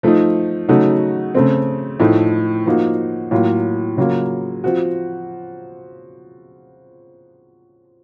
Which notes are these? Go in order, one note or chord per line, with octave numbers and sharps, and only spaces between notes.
F3 A3 D#4
C#3 F#3 A3 D#4 F#4
C#3 A3 C4
A2 F3 A3 D#4
F3 A#3 D#4 F#4
A2 F#3 A#3 F4
C#3 F#3 A#3 F4
F3 C4 F#4